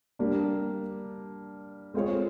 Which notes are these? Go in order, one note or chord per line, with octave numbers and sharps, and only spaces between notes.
G3 A#3 D4
G#3 C4 F4 G#4 C#5